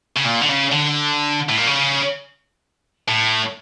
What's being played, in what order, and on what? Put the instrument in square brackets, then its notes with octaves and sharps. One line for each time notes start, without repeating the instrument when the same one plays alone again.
[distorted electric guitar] C#3
A#2
D3
C#3
D3
A2
A#2
C#3
A2